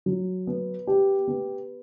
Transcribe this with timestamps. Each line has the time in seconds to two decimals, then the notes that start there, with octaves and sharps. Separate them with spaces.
0.06 F#3
0.47 B3
0.87 G4
1.28 B3